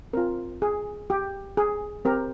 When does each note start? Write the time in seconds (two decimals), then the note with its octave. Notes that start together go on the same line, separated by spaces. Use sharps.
0.13 C4 F4 A#4
0.62 G#4
1.10 G4
1.57 G#4
2.05 C4 G4 A#4